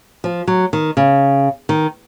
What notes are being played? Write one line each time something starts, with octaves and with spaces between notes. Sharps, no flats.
F3
F#3
D#3
C#3
D#3